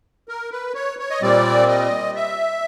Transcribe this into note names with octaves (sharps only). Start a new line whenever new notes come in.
A#4
B4
C#5
C#5
D#5
A#2 G3 C4 D5
D#5
E5